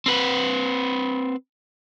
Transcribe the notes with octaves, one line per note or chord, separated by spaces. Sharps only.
C4 B4